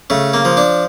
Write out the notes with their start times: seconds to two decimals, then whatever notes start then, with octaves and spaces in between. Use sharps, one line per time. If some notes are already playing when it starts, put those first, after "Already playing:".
0.10 C#3 A3
0.34 A#3
0.45 F3
0.57 D4